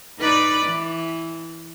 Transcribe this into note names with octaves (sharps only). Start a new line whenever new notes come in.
D#4 B4 D5
E3